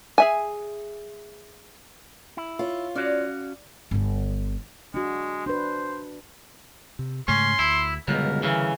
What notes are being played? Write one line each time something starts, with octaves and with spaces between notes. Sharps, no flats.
G#4 E5 G#5
E4
F4 C#5
C#4 F#4 D5 F5
G1 D3
G#3 D4 F#4
D4 B4 C5
C3
G#2 C#3 A3 C#4 C6
D2 E4
C#2 F#2 B2 D3 G3 A#4
C#3 E3 A#4